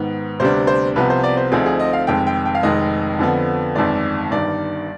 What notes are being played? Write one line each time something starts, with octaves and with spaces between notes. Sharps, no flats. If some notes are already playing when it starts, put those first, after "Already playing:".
Already playing: G#2 D#3 B3
D2 C3 G3 B3 D4 C5
C5
C2 C3 F3 B3 B4
C5
D5
C5
D2 D3 F3 C4 D#4 G#4
G#4
D#5
F5
F1 F2 D#3 G#3 G5
G5
G5
F5
F1 F2 D#3 G#3 D#5
F2 D3 F3 B3
G1 F2 D#3 G#3 D5
G1 G2 D#3 D5